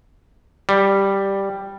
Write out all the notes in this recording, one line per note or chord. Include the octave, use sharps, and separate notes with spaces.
G3